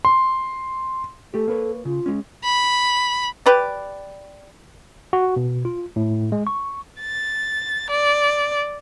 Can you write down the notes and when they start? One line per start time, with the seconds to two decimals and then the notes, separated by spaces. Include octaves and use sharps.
0.05 C6
1.34 A3 G4 A4
1.48 A#3 B4 C#5
1.85 C#3 F4
2.06 G#3 C#4
2.44 B5
3.46 G4 B4 D5
5.13 F#4
5.36 B2
5.65 F4
5.96 A2
6.32 G#3
6.47 C#6
7.00 A6
7.91 D5